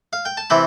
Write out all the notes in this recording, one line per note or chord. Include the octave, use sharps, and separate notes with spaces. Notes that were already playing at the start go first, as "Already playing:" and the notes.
F5
G5
A5
C3 E3 G5 B5